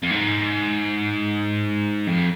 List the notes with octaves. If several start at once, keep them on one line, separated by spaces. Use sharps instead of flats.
F2
G#2
F2